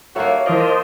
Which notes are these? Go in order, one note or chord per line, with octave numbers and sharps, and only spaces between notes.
D#2 A#3 F#4 A4 C#5 E5
E3 D4 F4 A#4 C5 D#5 F#6